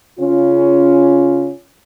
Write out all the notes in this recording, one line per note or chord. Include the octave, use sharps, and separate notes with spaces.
C#3 C#4 F4